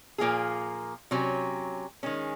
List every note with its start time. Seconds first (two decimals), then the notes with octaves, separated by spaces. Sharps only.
0.18 A#2 F3 A#3 F4 G#4
1.11 C3 F#3 C#4
2.03 D#3 G#3 C#4